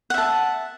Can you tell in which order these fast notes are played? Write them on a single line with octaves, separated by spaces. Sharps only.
F#5 E5 A5